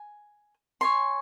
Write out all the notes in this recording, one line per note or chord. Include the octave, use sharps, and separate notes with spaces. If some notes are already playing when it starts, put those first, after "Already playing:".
Already playing: G#5
C#5 G#5 C6